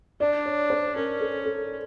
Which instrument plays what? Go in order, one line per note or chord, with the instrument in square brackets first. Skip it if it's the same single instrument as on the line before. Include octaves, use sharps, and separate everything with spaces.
[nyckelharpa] D4 [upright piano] D5
[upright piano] C#5
C5
[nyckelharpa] C#4 [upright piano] A#4
[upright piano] A4
A4